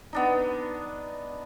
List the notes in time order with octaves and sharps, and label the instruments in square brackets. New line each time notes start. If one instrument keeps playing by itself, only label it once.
[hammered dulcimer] B3 D4 D#4